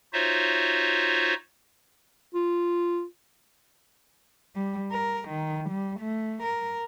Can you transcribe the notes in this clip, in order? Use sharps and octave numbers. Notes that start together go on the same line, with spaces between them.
D#4 F4 F#4 C5 C#5 E5
F4
G3
A#4
D#3
G3
A3
A#4